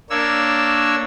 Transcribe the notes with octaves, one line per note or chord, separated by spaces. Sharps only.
A#3 D4 C#5 E6